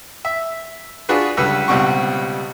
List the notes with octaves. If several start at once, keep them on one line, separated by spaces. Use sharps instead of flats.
E5
D4 F4 F#4 G#4 B4
C#2 D3 G3 B4
C#2 B2 G3 C4 F#5 C#6